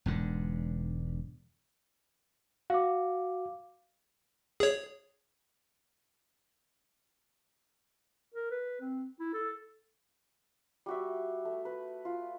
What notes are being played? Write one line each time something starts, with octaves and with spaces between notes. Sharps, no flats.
E1 G#2 D3
F#4 F5 D6
G#4 C#5
A#4
B4
C4
E4
A4
G3 F#4 E5
A3
B4
F4